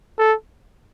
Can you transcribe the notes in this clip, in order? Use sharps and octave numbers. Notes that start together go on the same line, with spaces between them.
A4